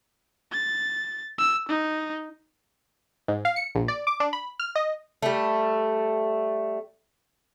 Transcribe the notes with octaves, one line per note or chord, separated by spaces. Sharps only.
A6
E6
D#4
G#2
F5
C#7
A#1
D5
D6
D4
B5
F6
D#5
G3 A3